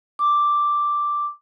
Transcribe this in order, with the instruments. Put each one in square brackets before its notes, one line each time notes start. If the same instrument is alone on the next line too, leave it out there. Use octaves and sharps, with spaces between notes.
[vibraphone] D6